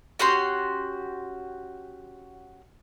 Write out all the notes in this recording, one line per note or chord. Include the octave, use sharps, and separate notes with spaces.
C#4 F#4 G4 C6